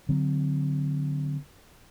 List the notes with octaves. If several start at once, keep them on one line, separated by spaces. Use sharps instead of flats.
D3 F#3 C4